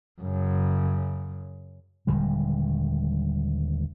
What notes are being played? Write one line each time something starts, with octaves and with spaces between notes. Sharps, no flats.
F#2 C#3
D#1 D3 G3 G#3